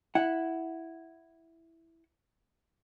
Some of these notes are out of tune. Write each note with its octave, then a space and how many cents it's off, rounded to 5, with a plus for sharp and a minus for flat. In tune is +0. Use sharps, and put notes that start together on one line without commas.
E4 +0 F#5 +0